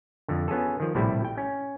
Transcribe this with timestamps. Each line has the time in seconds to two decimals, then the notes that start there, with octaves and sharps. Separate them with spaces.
0.28 F2 D3
0.48 B3 C#4 F4 G#4 A4
0.80 D#3 F3
0.95 A#1 A2 C3 G3 E4
1.25 G5
1.38 C#4